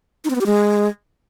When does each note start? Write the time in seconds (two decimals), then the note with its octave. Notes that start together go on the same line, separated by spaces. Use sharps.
0.25 D#4
0.30 C4
0.35 B3
0.41 G4
0.46 G#3